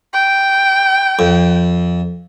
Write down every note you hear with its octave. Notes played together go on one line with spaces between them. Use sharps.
G5
F2